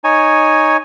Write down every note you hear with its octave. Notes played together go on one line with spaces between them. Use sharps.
D#4 C#5 G#5